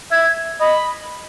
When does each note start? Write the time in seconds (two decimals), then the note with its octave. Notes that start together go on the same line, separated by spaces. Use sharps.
0.11 E5 G#6
0.60 D#5 B5